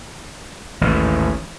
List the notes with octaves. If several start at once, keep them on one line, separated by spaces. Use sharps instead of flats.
A1 D#2 G#2